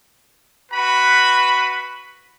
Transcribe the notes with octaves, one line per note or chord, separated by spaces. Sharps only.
F#4 B4 B5